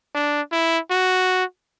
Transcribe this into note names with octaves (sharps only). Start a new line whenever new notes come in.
D4
E4
F#4